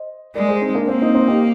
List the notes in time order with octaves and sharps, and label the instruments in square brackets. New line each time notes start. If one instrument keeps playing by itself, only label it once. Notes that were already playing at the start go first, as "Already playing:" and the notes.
Already playing: [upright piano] C5 D#5
[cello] G#3 [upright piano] A#4 D5
[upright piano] G#4 C5
C4 D#4
A#3 D4
[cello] A#3 [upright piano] C4
[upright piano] C4 D#4
C4 D#4
D#4 G4